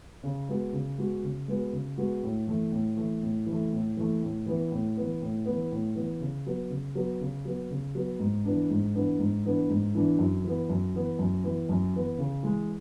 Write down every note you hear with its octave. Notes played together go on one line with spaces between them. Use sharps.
C#3
G#3 B3 F#4
C#3
G#3 B3 F#4
C#3
G#3 B3 F#4
C#3
G#3 B3 F#4
A2
E3 A3
A2
E3 A3
A2
E3
A3
A2
E3 A3
A2
E3 B3
A2
E3 B3
A2
E3 B3
A2
E3 B3
C#3
F#3 B3
C#3
F#3 B3
C#3
F#3 B3
C#3
F#3 B3
G#2
E3 B3 D4
G#2
E3 B3 D4
G#2
E3 B3 D4
G#2
E3 B3 D4
F#2
E3 B3
F#2
E3 B3
F#2
E3 B3
F#2
E3 B3
C#3
E3 G#3